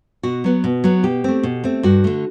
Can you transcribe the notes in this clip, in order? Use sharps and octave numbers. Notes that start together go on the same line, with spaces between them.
B2 F#4
F#3 B3
B2
F#3 B3
B2 G4
A3 C4
B2
A3 C4
G2 F#4
D3 A3